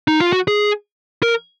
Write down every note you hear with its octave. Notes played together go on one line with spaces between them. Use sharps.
D#4
F4
F#4
G#4
A#4